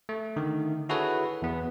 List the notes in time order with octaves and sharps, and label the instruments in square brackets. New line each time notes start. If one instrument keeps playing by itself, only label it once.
[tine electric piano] A3
D3 D#3
E4 F#4 G#4 A4 B4 C#5
E2 B3